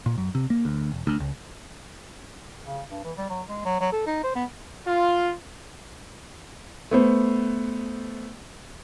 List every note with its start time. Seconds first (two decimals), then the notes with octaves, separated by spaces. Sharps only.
0.06 A#2
0.18 F#2
0.35 C3
0.50 A#3
0.65 D2
0.91 E1
1.07 D2
1.20 C#2
2.66 C#3
2.90 G2
3.04 E3
3.18 G3
3.30 F#3
3.49 G#3
3.65 F#3
3.81 F#3
3.93 A4
4.07 D#4
4.24 C5
4.35 B3
4.86 F4
6.91 A3 B3 C5